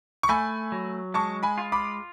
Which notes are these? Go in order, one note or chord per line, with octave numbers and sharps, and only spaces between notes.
C#6
A3 G#5 B5
F#3
G#3 A5 C#6
G#5 B5
F4
B5 D6